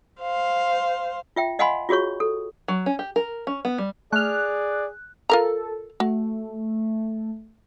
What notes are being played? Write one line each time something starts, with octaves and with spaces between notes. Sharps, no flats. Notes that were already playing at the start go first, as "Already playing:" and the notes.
C5 F5
F4 E5 G5
D#5 F5 F#5 G#5 B5 C6
F4 F#4 G#4 C#5 C#6
A4
F#3
C#4
G4
A#4
C#4
B3
G3
A3 G#4 D5 F6 F#6
F4 A4 A#4 A#5
A3 F#4